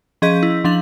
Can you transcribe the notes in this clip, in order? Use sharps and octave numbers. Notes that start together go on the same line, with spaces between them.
F3 C#4 G#4 D#5 G6 B6
E4
F3 D4 F5 F#7